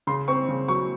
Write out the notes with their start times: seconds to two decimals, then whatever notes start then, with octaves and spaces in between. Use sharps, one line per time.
0.07 C#3 C6
0.28 C4 C#6
0.49 C#3
0.68 F#3 C#6